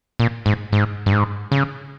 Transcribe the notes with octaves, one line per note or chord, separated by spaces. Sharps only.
A#2
G#2
G#2
G2
G#2
C#3